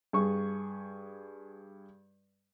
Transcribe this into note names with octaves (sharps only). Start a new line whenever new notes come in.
G2 G#4 C#6